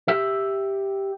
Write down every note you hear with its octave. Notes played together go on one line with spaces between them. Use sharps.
G4 E5